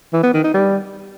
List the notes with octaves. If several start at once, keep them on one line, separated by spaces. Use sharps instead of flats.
E3
B3
D#3
D#4
G3